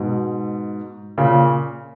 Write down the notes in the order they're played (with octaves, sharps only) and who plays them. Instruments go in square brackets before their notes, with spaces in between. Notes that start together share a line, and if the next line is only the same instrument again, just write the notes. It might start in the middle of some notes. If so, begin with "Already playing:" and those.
Already playing: [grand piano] G#2 B2
A#2 C#3